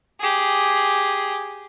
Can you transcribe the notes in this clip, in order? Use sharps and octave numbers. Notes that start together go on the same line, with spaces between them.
G4 G#4